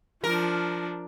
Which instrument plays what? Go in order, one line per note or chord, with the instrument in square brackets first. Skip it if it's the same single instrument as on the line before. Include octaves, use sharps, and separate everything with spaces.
[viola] F3 D4 [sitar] A#4